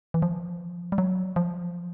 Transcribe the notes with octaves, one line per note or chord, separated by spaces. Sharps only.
E3
F3
G3
F#3
F3